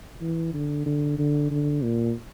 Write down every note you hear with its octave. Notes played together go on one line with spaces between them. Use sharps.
E3
D3
D3
D3
D3
A#2